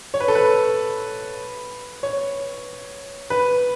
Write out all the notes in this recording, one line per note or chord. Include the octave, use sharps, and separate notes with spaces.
C#5
B4
A4
B4
C#5
B4